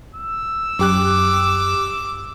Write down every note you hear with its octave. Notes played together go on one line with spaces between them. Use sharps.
E6
F#2 G4 D6 F#6